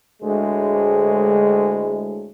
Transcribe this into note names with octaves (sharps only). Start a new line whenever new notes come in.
D2 A2 G#3